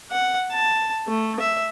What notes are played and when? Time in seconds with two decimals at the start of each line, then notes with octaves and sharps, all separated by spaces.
0.11 F#5
0.52 A5
1.07 A3
1.40 E5